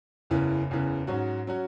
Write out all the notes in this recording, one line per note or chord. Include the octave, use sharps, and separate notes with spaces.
F#1 E2 C#3 E3
F#1 E2 C#3 E3
G#2 F#3 C#4 F#4
F#3 C#4 F#4